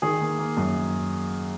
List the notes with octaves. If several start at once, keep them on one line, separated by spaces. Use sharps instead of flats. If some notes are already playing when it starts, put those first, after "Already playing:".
D#3 G#4
A#3
A#3
F#2